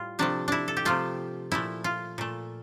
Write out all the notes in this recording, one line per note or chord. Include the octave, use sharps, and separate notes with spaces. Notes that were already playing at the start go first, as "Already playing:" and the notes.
Already playing: A2 G3 F4
C3 F3 A3 D4
D4 E4
A4
G4
C3 F3 A3 F4
A#2 F3 A3 E4
F4
A#2 A3